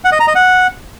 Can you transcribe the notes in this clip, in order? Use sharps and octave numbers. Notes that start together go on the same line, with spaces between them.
F#5
D#5
A#5
D#5
F#5